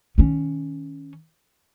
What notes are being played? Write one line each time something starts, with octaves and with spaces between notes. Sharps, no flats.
D#3 C#4